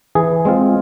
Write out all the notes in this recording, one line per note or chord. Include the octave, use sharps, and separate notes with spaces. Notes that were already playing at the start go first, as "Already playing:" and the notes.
E3 G#4
G#3 C4 F4